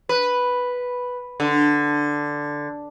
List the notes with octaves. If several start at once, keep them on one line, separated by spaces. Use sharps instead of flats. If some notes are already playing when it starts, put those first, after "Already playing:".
B4
D3